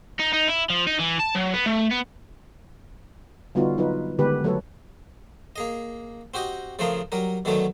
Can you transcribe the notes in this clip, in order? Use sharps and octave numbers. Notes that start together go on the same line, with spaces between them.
D#4
D#4
E4
F3
D#4
E3
A5
F#3
B3
A3
B3
D3 G3 B3 D#4 F4 F#4
F#3 D#4 F4 B4
D3 D#3 G#3 B3 G4 B4
F#3 A3 A4 B4 C#5
A#3 G#4 D#5
C4 F#4 G4 D#5
C#3 F3 A3 F4 G#4 A#4
F#3 G3 A#4
B2 D3 D#3 F#3 A3 C#4